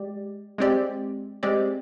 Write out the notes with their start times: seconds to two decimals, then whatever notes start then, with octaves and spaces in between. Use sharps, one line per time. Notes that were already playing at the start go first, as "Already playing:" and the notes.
Already playing: G#3 G4 D5
0.58 G#3 C4 G4 D5
1.43 G#3 C4 G4 D5